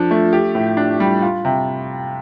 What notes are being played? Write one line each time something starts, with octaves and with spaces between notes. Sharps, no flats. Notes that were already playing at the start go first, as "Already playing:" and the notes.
Already playing: F3 D4 A4
A3
G4
A2
D4
G3
F4
C3